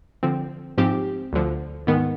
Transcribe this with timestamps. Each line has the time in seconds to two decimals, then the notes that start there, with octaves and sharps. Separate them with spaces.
0.23 D3 F3 C4
0.78 G#2 F3 C4 G4
1.33 D2 D3 F3
1.87 G#2 D#3 B3